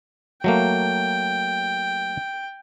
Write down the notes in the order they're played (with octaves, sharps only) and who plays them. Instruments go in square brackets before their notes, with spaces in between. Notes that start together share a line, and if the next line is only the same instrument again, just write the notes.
[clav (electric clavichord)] F#3 A3 A#3 [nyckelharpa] G5